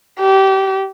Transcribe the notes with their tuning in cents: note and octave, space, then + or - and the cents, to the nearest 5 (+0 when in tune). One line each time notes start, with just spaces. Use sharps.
G4 -25